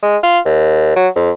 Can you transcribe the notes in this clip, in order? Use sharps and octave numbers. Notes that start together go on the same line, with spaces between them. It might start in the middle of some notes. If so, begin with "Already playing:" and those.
G#3
F4
D#2
F#3
F2